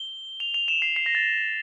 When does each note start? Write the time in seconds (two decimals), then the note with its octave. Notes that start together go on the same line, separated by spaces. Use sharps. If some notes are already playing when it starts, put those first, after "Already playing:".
Already playing: G7
0.40 F7
0.54 F7
0.68 E7
0.82 C7
0.96 C7
1.06 A#6
1.15 A6